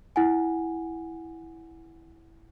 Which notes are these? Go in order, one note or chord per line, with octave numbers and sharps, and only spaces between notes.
E4 F#5 G#5